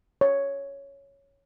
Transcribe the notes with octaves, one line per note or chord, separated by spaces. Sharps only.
C#5